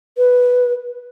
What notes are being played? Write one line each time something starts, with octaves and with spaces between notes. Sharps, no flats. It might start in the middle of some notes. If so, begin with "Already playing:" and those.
B4